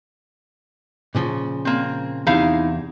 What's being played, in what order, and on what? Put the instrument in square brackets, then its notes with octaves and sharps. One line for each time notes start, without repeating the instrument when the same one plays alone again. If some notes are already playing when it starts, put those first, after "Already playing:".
[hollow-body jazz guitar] A#2 C#3 F3
[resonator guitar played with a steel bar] A#3 C4
[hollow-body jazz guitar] E2 C3 [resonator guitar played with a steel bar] D#4 E4 F5